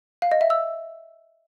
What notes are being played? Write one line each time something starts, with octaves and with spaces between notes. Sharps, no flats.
F5
D#5
E5
E6